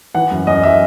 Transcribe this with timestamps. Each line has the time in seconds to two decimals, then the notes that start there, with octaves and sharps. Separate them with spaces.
0.15 E3 F#5
0.31 F#2
0.47 F#2 D#5
0.63 E5